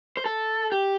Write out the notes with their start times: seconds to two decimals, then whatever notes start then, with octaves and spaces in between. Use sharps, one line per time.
0.17 C5
0.26 A4
0.72 G4